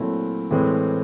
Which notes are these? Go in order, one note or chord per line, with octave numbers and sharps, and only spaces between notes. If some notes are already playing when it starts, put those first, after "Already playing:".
Already playing: A#2 F#3 A3 C4 E4
A2 E3 G#3 C4